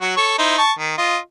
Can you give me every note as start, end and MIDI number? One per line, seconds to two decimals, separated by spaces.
0.01 0.12 54
0.01 0.12 66
0.17 0.34 69
0.17 0.34 73
0.17 0.34 85
0.39 0.58 63
0.39 0.58 64
0.39 0.58 72
0.58 0.72 81
0.58 0.72 85
0.79 0.98 51
0.98 1.17 65
0.98 1.17 75